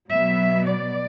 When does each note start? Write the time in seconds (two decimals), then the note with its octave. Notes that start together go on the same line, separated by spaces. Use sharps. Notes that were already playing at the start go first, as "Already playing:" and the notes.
0.10 B2 F#3 B3 E5
0.65 D5